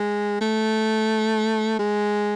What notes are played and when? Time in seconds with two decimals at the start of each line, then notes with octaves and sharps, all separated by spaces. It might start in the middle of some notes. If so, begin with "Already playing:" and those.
Already playing: G#3
0.41 A3
1.79 G#3